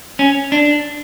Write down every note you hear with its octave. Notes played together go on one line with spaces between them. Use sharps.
C#4
D4